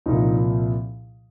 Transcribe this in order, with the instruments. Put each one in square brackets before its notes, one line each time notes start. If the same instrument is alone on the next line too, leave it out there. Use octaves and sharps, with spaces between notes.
[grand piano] C2 A#2 F3 D#4